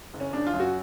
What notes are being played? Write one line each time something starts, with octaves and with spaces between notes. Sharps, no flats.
F#1
C#4
C#3 D4
F4
F#2
F#4